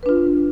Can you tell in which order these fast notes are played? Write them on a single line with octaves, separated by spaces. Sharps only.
B4 D4 F4